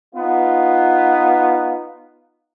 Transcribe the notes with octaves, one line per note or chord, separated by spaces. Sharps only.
B3 D#4 F4